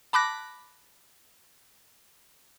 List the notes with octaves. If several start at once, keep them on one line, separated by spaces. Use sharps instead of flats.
A5 B5 D6 F#6 A#6